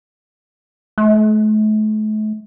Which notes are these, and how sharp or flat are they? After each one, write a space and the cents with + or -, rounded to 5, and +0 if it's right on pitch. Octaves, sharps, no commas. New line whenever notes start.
A3 -40